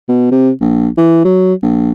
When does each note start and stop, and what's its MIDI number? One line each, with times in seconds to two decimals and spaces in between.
0.09 0.30 47
0.32 0.50 48
0.61 0.88 34
0.97 1.25 52
1.25 1.54 54
1.62 1.92 34